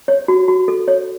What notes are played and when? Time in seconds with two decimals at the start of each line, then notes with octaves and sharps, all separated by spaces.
0.08 C#5
0.28 F#4
0.48 F#4
0.68 A4
0.88 C#5